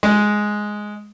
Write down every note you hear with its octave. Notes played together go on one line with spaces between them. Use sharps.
G#3